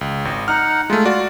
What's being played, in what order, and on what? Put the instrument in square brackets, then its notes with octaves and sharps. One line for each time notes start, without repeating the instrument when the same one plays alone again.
[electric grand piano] C#2
[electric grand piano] G#1 [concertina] D#5
[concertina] D#4 F#5 [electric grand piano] F6
[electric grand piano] G#3 A3 [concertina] F4
[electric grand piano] F#4 D5